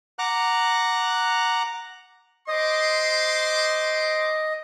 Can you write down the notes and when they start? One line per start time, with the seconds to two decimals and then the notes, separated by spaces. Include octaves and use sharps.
0.19 F#5 A#5 D6 F#6
2.48 C5 D#5 C6 D6